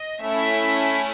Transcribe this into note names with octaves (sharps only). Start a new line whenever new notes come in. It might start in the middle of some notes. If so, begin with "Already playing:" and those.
Already playing: D#5
A3 C#4 E4 E5